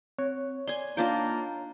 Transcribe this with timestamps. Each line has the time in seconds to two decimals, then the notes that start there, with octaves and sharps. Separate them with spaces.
0.18 C4 C#5
0.67 D5 G#5 C6
0.97 A#3 D4 D#4 F4 G5